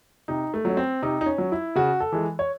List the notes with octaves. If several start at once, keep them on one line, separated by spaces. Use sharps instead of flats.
C3 D#4
A3
F#3
C#4
C4
C3 D#4
D#4
C#4
F#3
E4
C#3 F#4
A4
E3 G#3
C#5